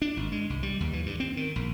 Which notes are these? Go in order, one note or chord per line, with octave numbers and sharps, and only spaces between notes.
D4
G#1
G#3
C2
G3
D#2
E3
G2
C4
D#3
A#1